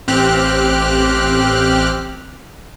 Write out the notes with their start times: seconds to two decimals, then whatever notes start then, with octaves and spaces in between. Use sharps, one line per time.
0.08 A1 C4 G4 F6 F#6